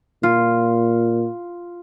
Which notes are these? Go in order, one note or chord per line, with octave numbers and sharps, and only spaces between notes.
A#2 F4